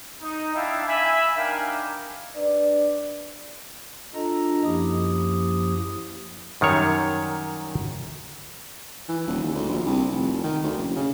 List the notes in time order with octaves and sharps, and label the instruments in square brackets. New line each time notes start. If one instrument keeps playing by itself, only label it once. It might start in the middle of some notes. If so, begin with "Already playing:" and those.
[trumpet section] D#4
D4 E4 E5 F5 G5 A5
E5 G#5 B5
D4 D#4 A#4 F5 G5 G#5
[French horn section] D4 B4 D5
[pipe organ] D4 F4 A4 D#5 A#5
F#2 F3 A#3 E4 G4 D#6
[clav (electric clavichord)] F#2 D#3 G3 C#5
[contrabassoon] E3
D#1
D#2
D2
A#1
C2
F1
D#3
D2
F#1
C#3